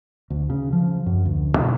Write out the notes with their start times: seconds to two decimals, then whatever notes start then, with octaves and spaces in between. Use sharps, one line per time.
0.30 D2
0.50 C#3
0.73 F3
1.06 F#2
1.25 D2
1.58 B2